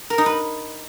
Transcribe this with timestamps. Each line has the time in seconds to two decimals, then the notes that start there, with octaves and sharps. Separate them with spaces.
0.10 A#4
0.18 D#4
0.26 B4